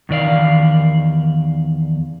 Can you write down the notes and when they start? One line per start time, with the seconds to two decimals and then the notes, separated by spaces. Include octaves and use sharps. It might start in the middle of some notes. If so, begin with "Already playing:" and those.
0.09 E2 D#3 D5 F5